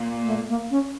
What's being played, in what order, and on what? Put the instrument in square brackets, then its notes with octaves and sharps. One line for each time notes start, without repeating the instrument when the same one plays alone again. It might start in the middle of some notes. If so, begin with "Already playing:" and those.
Already playing: [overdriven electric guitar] A#2
[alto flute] A#3
A3
A#3
C#4